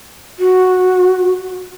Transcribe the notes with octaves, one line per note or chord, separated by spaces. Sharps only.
F#4